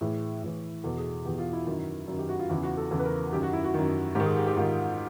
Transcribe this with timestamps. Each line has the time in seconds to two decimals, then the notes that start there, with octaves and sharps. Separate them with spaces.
0.01 A2 E3 G#4
0.43 A2 E3
0.84 E2 B2 A4
0.97 G#4
1.25 E2 B2 G4
1.39 F4
1.53 E4
1.66 F#2 D#3
2.08 F#2 D#3
2.19 G4
2.29 F#4
2.39 F4
2.50 E2 C#3 E3 E4
2.63 F#4
2.77 A4
2.91 E2 C#3 E3 A4
2.99 B4
3.05 A#4
3.33 F#2 D#3 G4
3.43 F#4
3.53 E4
3.64 F#4
3.74 F#2 D#3
4.15 G#2 G4
4.20 D#3
4.26 G#4
4.36 G4
4.47 G4
4.57 G#2 D#3 F4